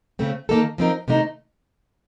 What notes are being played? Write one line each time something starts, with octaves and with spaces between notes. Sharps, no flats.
C#3 A3 C4
D#3 A#3 D#4 A4
F3 C4 D#4 A#4
C3 D#3 A3 D#4